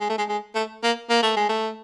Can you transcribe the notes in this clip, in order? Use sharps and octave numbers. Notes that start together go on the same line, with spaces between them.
G#3
A3
G#3
G#3
A3
A#3
A#3
A3
G#3
A3